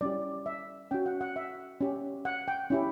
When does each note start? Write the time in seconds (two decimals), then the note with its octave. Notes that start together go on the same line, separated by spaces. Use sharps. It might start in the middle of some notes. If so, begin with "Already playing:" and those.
0.01 G3 C#4 E4 G4 D5
0.46 E5
0.91 C#4 F#4 G5
1.06 F#5
1.21 F#5
1.36 E5
1.81 C#4 G4
2.25 F#5
2.48 G5
2.70 C#4 E4 G4